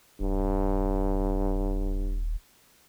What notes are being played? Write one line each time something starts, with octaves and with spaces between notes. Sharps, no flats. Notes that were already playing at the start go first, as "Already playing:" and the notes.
D#1 G2